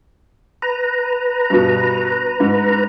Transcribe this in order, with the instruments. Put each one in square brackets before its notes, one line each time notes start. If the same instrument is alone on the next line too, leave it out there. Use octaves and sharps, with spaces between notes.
[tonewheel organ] B4 A#5
[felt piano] G2 B2
G#2